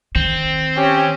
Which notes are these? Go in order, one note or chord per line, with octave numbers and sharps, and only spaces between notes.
D#3 C4
C#4 G4